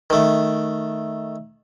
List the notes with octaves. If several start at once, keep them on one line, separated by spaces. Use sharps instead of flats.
D#3 A3